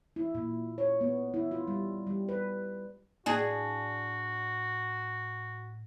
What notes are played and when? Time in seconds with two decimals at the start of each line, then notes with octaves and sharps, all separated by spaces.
0.16 E4
0.35 A#2
0.78 C#5
1.01 B3
1.34 E4
1.51 F4
1.68 G3
2.07 G3
2.29 B4
3.26 A2 D4 F#4 G#4